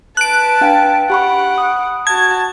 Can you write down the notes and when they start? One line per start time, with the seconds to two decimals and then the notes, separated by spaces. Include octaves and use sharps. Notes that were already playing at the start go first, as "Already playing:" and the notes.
0.17 B4 A5 F#6 D7
0.61 D4 F5 G5
1.10 G4 F#5 B5 C#6
1.58 D#6
2.07 F#4 A5 G#6